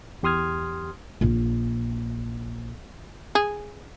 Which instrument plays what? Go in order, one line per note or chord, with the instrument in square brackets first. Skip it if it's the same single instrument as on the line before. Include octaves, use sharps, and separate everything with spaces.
[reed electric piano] E2 G4 C6 D#6 F6 G#6
[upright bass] A#1 F4
[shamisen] G#4